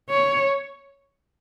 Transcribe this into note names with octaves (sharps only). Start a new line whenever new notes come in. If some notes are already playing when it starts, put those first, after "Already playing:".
C#5